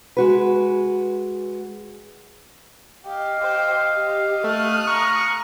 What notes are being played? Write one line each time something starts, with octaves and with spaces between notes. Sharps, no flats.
G#3 F#4 B4
G4 D#5 F5
G4 C5
G4
A3 D#6 F6 F#6
A#5 C#6